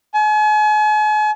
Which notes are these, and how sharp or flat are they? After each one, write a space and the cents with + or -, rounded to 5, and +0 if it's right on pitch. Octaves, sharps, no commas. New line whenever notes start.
G#5 +40